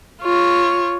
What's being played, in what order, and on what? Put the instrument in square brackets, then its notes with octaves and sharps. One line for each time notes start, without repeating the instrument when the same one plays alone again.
[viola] F4 C#5